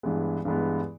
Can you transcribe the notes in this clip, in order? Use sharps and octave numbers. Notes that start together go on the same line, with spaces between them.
G2 E3 G#3 B3
G2 E3 G#3 B3